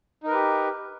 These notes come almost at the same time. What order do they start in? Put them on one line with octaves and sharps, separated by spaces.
D#4 A#4 B4 G4